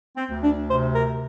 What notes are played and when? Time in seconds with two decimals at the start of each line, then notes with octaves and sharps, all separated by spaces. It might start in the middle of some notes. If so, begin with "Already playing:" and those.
0.15 C4
0.29 D2
0.42 D4
0.67 C3 C5
0.94 A#4
1.08 C3